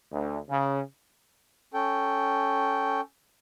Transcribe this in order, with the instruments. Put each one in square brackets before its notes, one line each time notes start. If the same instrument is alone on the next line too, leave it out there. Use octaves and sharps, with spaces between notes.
[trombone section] D2
C#3
[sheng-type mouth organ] C#4 A4 G5